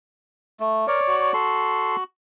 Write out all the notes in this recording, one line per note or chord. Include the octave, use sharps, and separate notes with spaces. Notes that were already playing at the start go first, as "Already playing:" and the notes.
A3
A#4 C#5 D5
F#4
A4 C6